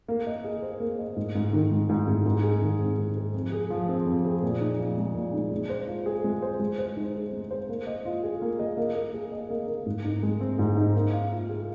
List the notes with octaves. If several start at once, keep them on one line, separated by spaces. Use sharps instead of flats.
A#3
D#5
G#4
C5
A#3
D#5
G#2
G#2
D#3
G#3
G#2
G#2
G#2
G#4
D#3
C4
G#2
G#4
F2
G#4
F3
C4
F2
G#4
A#2
D#4
F3
G#3
A#2
D#4
G#3
C5
F4
G#4
G#3
C5
G#3
C5
D#4
G#4
G#3
C5
A#3
D#5
F4
G#4
A#3
D#5
A#3
A#3
G#4
D#5
A#3
A#3
G#2
D#4
G#3
C4
G#2
D#4
A#3
F5
F4
G#4